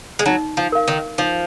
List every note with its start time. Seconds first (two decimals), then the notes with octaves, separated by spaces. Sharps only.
0.19 G#3
0.26 F#3 D#4
0.57 F3
0.72 A#4 F5
0.88 D#3
1.18 F3 D#4